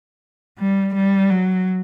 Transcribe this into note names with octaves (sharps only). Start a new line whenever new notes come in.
G3
G3
F#3